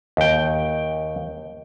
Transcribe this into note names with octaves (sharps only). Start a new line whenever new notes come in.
D#2 G5